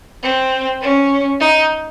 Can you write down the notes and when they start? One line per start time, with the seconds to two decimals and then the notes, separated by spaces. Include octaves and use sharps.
0.23 C4
0.82 C#4
1.40 D#4